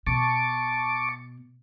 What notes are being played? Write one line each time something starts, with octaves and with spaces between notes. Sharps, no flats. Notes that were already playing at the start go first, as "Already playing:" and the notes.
B2 A5 C#6 D6